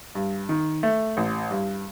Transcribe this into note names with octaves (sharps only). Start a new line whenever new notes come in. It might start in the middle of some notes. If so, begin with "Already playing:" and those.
G2
D#3
A3
A1
G2